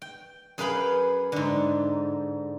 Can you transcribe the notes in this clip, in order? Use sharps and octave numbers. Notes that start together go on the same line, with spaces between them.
G5
F#2 G#4 B4 F5 G5 B5
G#2 D3